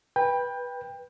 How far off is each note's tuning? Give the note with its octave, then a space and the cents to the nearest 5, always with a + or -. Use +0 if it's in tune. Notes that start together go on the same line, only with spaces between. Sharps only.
B4 -15 G5 +25